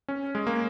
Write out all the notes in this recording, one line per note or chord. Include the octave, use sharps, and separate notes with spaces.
C#4
G#3
A#3